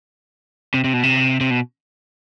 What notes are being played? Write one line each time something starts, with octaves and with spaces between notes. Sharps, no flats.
C3
C3
B2
C3
C3
B2